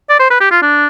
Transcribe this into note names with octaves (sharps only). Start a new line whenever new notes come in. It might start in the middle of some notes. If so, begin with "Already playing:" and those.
D5
C5
B4
G4
F4
D4